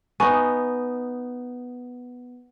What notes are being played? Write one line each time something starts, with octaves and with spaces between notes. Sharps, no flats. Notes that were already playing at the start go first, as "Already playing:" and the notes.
B3 D#4 G#5 C#6